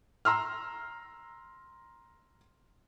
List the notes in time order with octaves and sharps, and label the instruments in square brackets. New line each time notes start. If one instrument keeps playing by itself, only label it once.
[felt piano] A#5 C6 E6 F6